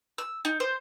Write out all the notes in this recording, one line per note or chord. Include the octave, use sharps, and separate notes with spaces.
E6
D#4
C5